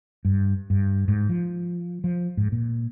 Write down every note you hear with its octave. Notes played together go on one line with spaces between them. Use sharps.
G2
G2
G#2
F3
F3
G#2
A#2